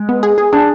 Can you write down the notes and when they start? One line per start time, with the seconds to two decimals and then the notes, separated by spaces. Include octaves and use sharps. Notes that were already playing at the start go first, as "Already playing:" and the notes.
Already playing: G#3
0.09 B3
0.23 G#4
0.38 G#4
0.53 D4 G#4